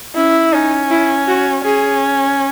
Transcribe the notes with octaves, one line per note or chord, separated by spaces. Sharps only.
C#4 E4
C#4 D#4
E4
F#4
C#4 G#4